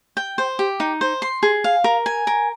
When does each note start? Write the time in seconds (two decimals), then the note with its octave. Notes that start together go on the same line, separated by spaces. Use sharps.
0.17 G5
0.38 C5
0.59 G4
0.80 D#4
1.01 C5
1.22 C6
1.43 G#4
1.64 F5
1.84 A#4
2.06 G#5
2.27 A#4